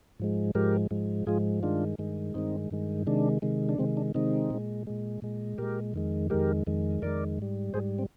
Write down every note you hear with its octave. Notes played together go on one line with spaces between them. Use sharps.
G#2 F3 G#3
G#2 F3 G#3 G4 A#4
G#2 F3 G#3
G#2 F3 G#3 F4 G#4
G2 D#3 G#3 D4 F4
G2 D#3 G#3
G2 D#3 G#3 C4 D#4
G2 D#3 G#3
C3 D#3 G#3 D4
C3 D#3 G#3
D4
C3 D#3 G#3 C4
D4
C3 D#3 G#3 C4 D#4
A#2 G#3
A#2 G#3
A#2 G#3
A#2 G#3 G4 A#4
F2 D#3 G#3
F2 D#3 G#3 G4 A#4
F2 D#3 G#3
F2 D#3 G#3 A#4 D5
G#2 G3
G#2 G3 G#4 C5
C4